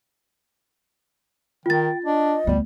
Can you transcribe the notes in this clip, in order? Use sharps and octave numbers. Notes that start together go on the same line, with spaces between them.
D#3 F4 G5 A6
D4 D#5
D2 G3 B3